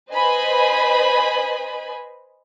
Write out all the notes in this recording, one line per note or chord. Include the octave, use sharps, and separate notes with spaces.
B4 C5 D#5 G#5 B5